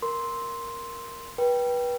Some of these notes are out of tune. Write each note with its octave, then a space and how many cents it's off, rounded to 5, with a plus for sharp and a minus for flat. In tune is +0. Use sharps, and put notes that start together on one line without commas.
A#4 +0 C6 +0
B4 -25 G5 +0